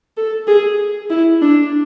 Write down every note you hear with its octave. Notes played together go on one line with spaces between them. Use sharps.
A4
G#4
E4
D4